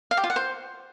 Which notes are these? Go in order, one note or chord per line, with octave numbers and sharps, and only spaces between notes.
F5
G4
F4
F#5
C5